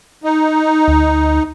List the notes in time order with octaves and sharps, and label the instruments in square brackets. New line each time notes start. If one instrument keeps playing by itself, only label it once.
[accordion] D#4
[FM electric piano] D2